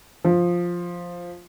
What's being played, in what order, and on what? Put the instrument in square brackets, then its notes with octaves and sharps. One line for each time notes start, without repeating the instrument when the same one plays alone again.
[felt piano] F3